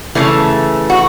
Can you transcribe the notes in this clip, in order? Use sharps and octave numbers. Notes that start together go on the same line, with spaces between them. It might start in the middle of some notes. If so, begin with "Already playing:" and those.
C#3 E3 A3
F#4